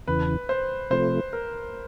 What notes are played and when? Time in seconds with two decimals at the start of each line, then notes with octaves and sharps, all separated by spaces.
0.07 E2 C#3 E3 B4
0.49 C5
0.90 C3 F3 A3 C5
1.33 A#4